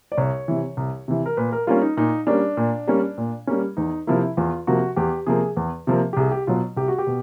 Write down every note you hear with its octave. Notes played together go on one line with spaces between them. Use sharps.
D5
C2 C#5
C3 E3
C2
C3 E3
A#4
A#2 B4
A#4
G3 A#3 C#4 F4
D#4
A#2 D#4
G3 A#3 C#4 D4
A#2
G3 A#3 C#4
A#2
G3 A#3 C#4
E2 D#4
C3 F3 A#3 E4
E2 F4
C3 F3 A#3 F#4
E2 G4
C3 F3 A#3 G#4
E2
C3 F3 A#3
G4
C2 G#4
G4
B2 F#3 F4
C2 G4
F#4
G4
B2